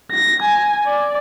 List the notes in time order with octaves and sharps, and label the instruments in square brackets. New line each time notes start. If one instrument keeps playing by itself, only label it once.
[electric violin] A#6
G#5
D5